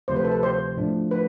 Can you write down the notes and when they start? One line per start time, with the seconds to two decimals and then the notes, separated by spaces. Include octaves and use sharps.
0.08 D2 C3 F3 C5
0.16 B4
0.24 A4
0.32 B4
0.43 C5
0.77 A2 F3 A3 D4
1.11 B4